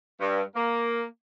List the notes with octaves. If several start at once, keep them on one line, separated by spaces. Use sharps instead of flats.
G2
A#3